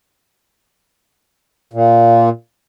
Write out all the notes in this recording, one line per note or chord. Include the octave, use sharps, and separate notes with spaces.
A#2